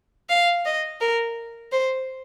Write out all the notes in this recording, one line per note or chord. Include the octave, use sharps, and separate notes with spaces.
F5
D#5
A#4
C5